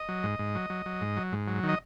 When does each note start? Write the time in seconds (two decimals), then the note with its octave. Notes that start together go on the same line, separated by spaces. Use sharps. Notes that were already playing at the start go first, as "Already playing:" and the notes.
Already playing: D#5
0.09 F#3
0.23 G#2
0.39 G#2
0.55 F#3
0.70 F#3
0.86 F#3
1.01 G#2
1.17 F#3
1.32 G#2
1.48 F#3
1.63 D#3
1.69 D#5